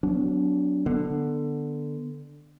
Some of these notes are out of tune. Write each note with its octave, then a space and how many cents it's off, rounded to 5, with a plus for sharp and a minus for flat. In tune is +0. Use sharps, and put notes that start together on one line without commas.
F#3 +0 B3 +25 D4 -20
D3 +10 B3 -10